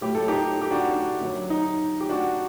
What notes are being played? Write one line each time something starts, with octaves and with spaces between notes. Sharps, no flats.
A2 F#3 G4
A4
D#4 G4
D#4 G4
D4 F#4
D4
F#2 F#3
D#4
G4
D4 F#4